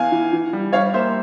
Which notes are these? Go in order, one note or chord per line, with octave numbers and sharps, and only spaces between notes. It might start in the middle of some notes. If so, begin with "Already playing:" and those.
Already playing: E2 F5 G#5
E3
E3
G3
G3 C#5 F5
A#3 C5 E5